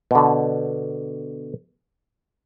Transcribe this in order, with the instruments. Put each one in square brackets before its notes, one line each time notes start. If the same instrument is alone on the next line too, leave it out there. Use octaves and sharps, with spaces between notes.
[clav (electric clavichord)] B2 D3